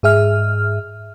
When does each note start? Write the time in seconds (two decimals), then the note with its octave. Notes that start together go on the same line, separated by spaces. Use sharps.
0.03 G#2 G#4 E5 F6